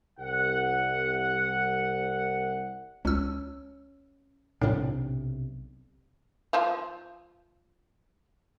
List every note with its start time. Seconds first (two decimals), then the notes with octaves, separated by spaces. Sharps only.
0.19 C2 F#5
3.05 C#2 C#4 E6
4.62 B1 A2 C3 D4
6.53 F3 C5 F5